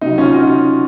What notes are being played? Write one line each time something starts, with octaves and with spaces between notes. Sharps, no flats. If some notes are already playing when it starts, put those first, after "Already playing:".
C3 F#3 D#4
C#4 F4
D#4 F#4